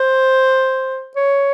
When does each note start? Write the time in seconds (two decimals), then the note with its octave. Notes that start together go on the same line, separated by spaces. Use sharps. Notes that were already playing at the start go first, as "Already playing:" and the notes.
Already playing: C5
1.16 C#5